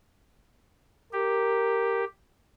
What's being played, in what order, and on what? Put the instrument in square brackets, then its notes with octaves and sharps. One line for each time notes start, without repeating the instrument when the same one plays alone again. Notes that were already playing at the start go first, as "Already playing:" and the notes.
[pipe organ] G4 [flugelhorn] A#4